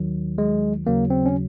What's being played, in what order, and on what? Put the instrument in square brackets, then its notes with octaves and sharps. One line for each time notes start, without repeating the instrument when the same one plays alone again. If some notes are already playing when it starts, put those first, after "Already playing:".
Already playing: [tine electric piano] D#2 D#3 F#3
G#3
D#2 C#3 F#3 A#3
C4
C#4